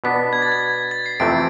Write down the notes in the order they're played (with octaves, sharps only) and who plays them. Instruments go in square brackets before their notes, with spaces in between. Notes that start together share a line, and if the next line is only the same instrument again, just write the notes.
[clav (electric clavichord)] B2 B3 D4 [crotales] B6
[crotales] G#6
A6
G#6
A6
C7
[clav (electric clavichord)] F2 C3 E3 A3 C4 [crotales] D7